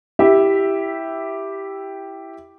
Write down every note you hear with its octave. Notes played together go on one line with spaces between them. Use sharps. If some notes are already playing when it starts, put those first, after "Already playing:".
E4 G4 E5